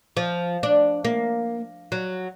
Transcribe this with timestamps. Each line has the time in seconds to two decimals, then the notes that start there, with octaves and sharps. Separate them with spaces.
0.17 F3
0.63 D4
1.05 A#3
1.92 F#3